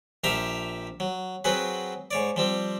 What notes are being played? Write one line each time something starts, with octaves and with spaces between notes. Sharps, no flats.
A#1 F3 G4 E5 F5 A#5
F#3
F#3 C4 F#4 G#4 B4
G#2 C#5 D5
F3 G3 C4